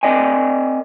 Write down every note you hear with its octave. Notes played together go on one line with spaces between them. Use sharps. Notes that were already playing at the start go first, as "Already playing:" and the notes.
C4 A#4 D5 D#5 G5 G#5